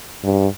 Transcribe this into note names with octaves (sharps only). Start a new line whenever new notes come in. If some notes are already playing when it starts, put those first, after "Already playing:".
G2